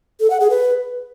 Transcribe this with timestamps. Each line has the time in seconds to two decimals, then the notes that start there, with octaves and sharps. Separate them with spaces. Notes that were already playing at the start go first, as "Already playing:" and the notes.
0.20 A4
0.30 F#5
0.40 G#4
0.50 B4